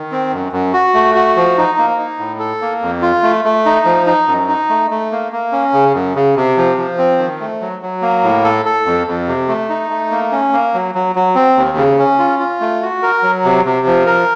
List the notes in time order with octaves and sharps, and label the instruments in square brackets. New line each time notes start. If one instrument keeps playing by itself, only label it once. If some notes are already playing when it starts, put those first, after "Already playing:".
Already playing: [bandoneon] D#3
C4
F#2
F#2
F#4
A3
F#4
F3
D#4
A#3
D#4
A2
A4
A#3
F2
F4
A3
A3
D#4
F3
D#4
F#2
D#4
A3
A3
A#3
A#3
C#4
C#3
F#2
C#3
C3
F3
F3
C4
D#3
A3
F#3
F#3
A#3
A2
A4
A4
F2
F2
C3
A3
D#4
A3
A#3
C#4
A#3
F#3
F#3
F#3
C4
D#2
C#3
C#4
F4
F4
A3
F#4
A#4
F#3
C3
C3
F3
A#4